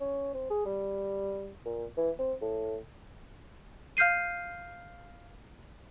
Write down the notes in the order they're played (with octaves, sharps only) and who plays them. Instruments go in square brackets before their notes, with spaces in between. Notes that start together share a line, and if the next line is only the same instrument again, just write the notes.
[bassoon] C#4
C4
G#4
G3
A#2
E3
C4
A2
[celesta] F5 F6 G6 C7 D#7